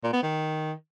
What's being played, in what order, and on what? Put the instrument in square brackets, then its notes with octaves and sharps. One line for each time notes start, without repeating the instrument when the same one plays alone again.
[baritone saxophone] A#2
B3
D#3